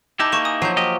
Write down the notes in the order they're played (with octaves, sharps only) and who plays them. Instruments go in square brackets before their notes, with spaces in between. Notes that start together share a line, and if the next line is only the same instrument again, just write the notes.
[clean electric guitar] D#4 E4 G4 [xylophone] A5 D6 E6
[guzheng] A#3 [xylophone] A5 C#6 E7
[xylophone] G#5 D#6
[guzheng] F3 F#3 [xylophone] G6 C7
[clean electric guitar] A#3 G4 D#5